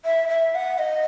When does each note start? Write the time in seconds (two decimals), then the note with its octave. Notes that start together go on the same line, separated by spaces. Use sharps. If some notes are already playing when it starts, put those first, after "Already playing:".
0.05 E5
0.29 E5
0.55 F#5
0.79 D#5